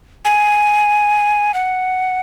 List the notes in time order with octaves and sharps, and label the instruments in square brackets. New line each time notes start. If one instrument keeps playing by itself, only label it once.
[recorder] G#5
F#5